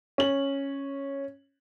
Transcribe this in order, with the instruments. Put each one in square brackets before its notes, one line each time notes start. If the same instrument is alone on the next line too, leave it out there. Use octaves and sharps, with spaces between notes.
[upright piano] C#4 F#7